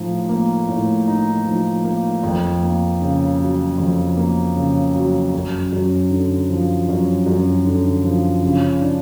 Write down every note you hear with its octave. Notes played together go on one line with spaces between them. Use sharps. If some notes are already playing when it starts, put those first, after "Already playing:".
Already playing: A2 F3 D#4
A#3
A2
D#4
F3
A#3
F2
A#3
C#3
F#3
F2
A#3
C#3
F#3
F#2
F#2
D3
F3
F#2
F#2
D3
F3
C#3
D4